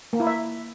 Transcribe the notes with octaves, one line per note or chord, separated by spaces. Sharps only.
A#3
E4
E5